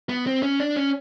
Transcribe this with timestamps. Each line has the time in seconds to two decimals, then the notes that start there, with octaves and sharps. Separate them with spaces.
0.09 B3
0.27 C4
0.43 C#4
0.60 D4
0.76 C#4